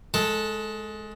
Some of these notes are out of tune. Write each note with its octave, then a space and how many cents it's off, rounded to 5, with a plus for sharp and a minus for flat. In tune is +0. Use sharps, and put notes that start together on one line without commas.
G#3 +20 A4 +0 A5 +0